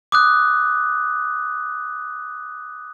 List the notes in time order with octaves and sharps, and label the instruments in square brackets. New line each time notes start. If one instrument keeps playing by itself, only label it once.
[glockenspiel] D6 D#6 F#6